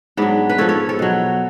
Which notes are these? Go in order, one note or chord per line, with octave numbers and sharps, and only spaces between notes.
G#2 F#3 B3 D4
B4
G#2 F3 A4 C#5
A4 C#5
A4 C#5
B2 F#3